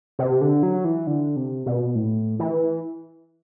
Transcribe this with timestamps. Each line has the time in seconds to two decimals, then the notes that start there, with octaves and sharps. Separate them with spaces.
0.19 C3
0.41 D3
0.63 F#3
0.85 E3
1.07 D3
1.36 C3
1.66 B2
1.95 A2
2.40 E3